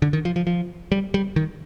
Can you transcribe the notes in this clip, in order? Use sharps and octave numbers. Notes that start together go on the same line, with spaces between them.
D3
D#3
F3
F3
F3
G3
G3
D#3